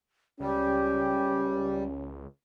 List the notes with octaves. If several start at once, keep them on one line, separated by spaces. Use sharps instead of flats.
C#2 G3 C#4 G4